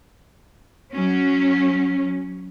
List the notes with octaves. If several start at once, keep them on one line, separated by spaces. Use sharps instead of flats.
F#3 C#4